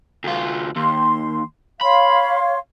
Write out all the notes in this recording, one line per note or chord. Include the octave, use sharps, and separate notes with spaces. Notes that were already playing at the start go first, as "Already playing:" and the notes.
D2 F4
D#2 C6
C#5 F5 B5 C6